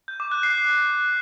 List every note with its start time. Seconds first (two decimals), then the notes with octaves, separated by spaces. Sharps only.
0.08 G6
0.20 D6
0.32 F#6
0.43 C7